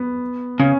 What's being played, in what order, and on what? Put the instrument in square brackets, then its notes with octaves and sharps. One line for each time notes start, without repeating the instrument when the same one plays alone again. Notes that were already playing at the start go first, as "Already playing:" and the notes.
Already playing: [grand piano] B3
[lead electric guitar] C#3 [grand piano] C#4